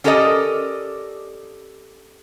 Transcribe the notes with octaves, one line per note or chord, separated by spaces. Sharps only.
C#4 G4 A4 A#4 D5 D#5